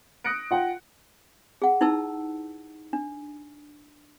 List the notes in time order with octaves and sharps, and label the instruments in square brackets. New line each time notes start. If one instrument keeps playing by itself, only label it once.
[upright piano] D#6 F#6 A#6 C#7 D7
F4 F#5 G5
[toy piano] G#4 F#5
D#4 E4 B4 A5 E6
D4